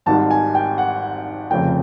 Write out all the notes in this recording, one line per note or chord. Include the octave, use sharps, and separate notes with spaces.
G#1 G#2 D#3 G3 A5
G#5
G5
F#5
F1 F2 C#3 G5